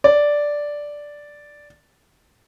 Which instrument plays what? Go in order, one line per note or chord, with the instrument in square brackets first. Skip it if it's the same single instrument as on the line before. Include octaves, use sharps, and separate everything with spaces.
[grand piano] D5